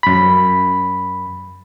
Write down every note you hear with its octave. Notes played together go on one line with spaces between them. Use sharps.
F#2 B5